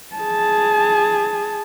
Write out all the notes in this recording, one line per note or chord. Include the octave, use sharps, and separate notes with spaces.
G#4 A5